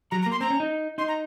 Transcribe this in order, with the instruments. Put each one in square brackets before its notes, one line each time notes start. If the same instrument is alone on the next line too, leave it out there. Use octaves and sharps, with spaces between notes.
[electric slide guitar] F#3 [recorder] A#5
[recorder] A#5
[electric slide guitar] A#3
[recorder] C6
[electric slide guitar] C4 [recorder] A#5
[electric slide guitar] C#4
D#4
[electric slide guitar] D#4 [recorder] C6
[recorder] A#5